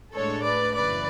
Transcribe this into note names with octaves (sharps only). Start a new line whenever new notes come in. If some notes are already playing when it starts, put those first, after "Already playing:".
A2 G#3 D4 A4 C#5
B4 D5
F#2 C#3 E3 B4 D5